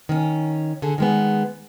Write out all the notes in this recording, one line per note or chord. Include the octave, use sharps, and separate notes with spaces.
D#3 C#4
D3 G#4 A4
D#3 G#3 B3